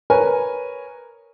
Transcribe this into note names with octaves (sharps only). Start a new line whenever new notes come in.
A#4 B4 C#5 G#5